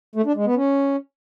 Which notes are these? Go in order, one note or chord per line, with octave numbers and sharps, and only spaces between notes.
A3
D4
G#3
B3
C#4